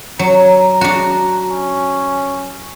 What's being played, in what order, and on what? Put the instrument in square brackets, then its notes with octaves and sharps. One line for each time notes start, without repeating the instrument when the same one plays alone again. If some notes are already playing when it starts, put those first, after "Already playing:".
[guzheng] F#3 [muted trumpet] A#5
[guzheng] D4 F#4
[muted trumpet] C#4